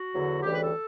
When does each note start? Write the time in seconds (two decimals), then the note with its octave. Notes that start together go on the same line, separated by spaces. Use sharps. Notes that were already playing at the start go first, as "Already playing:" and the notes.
Already playing: F#4
0.15 E2 D3 F#3
0.43 D2 C#3 E3 G3 G4
0.53 B4
0.62 A4